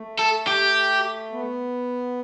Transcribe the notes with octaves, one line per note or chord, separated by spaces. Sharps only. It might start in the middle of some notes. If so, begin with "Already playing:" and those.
Already playing: A3
A4
G4
B3